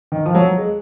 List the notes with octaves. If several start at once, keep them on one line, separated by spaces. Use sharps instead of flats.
D#3
F3
F#3
G#3